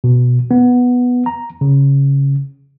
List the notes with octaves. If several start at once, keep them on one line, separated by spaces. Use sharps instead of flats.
B2
B3
A#5
C#3